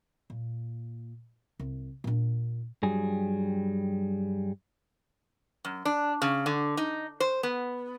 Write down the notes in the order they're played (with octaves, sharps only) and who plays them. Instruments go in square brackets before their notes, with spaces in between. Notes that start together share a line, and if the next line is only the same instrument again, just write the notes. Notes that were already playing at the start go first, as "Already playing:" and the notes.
[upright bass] A#2
C2
A#2 D4
[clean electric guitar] G2 F#3 G3 G#4
[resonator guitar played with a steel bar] F#2
D4
C#3
D3
D#4
C5
B3